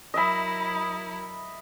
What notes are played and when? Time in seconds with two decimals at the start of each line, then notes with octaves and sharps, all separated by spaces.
0.14 F#3 E4 A#4 D#5 E5 B5